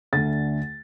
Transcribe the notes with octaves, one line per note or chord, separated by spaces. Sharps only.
D2 D3 A3 A6